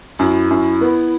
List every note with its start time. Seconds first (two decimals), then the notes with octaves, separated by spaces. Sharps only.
0.19 F#2 E4
0.50 F#2
0.81 B3